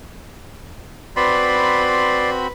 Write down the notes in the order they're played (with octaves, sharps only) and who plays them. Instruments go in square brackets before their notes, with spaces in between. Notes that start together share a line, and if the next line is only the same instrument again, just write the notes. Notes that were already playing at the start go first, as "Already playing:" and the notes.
[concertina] C4 F#4 B5 [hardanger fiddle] B4 [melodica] D5 C6